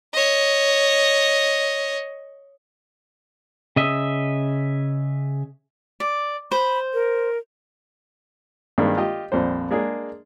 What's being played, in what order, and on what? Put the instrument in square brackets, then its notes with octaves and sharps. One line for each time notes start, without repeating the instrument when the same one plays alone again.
[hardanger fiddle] C#5 D#5
[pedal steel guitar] C#3 D#5 E5
[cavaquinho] D5
[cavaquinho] C5 [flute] B5
[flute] A#4
[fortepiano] G2 D#3 G#3 A#3 C4 D4
F4 G4 D#5
A#1 F2 G3 C5
G#3 A#3 D4 G#4